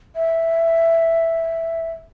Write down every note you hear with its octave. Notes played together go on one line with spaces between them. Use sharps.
E5